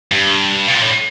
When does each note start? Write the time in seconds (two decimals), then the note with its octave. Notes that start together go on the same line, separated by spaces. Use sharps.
0.12 G2
0.68 B2
0.75 A#2
0.82 A2